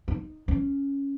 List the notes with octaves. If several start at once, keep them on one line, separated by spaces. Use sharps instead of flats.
D#4
C#4